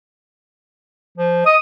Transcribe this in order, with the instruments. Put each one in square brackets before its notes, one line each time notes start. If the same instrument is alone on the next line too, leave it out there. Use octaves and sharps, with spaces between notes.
[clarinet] F3
[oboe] D#5 [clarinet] D#6